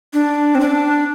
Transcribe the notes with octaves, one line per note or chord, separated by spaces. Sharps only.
D4
C4
D4